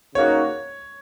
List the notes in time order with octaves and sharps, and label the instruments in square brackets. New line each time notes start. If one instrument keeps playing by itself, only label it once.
[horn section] C#3 A#3 D#4 F#4 [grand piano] C#5